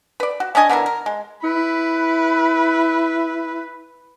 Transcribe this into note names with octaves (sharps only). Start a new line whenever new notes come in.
B4 D5
F#4
C#4 D4 D#5 G#5
D3 B3 E4 A#4
A#4
G#3
E4 B4